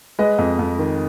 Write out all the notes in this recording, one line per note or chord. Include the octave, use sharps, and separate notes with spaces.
G#3 B4 D#5
F2
F2
D#3